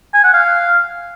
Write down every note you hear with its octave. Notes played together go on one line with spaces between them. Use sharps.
G#5
F#5
F5